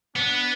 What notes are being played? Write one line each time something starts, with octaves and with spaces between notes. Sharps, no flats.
B3 D4